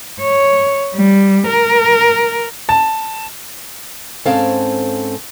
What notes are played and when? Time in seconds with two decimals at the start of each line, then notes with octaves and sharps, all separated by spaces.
0.21 C#5
0.95 G3
1.47 A#4
2.69 A5
4.26 G#2 C4 C#4 A4 F5 A5